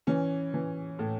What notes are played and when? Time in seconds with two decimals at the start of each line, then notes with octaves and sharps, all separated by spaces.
0.07 E3 C#4
0.54 E3
0.99 A2